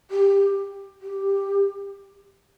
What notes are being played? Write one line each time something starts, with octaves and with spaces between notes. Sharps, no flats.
G4
G4